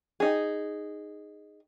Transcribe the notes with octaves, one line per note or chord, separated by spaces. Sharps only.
D#4 G#4